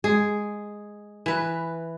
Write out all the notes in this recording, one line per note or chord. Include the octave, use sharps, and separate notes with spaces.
G#3 G#4
E3 B4